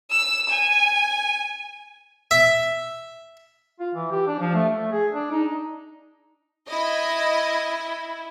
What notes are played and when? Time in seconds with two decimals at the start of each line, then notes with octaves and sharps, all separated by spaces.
0.11 E6
0.49 G#5
2.31 E5
3.80 F4
3.95 E3
4.11 G4
4.28 D4
4.40 F3
4.54 A3
4.75 A3
4.92 G#4
5.13 D4
5.32 D#4
6.69 E4 D#5